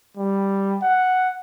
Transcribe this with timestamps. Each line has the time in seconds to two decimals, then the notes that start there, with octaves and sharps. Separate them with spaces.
0.17 G3
0.82 F#5